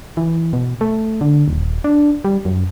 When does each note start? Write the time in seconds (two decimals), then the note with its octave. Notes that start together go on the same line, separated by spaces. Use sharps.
0.17 E3
0.53 B2
0.81 A3
1.21 D3
1.48 D#1
1.84 D4
2.25 G3
2.45 F#2